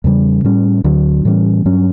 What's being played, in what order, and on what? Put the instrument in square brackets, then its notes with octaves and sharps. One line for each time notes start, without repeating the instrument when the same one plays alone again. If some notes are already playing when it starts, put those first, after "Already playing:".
[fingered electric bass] E2 C#3 G3
A2 G3 C#4
D2 D3 F#3
A2 E3 G3 C#4
G2 F#3 C#4